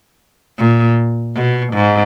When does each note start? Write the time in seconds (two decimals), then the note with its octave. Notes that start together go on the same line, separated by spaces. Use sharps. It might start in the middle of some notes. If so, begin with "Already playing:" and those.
0.58 A#2
1.35 B2
1.74 G#2